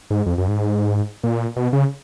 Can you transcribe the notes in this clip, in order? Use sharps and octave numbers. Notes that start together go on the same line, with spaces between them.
G#2
F2
F#2
G#2
A#2
B2
C#3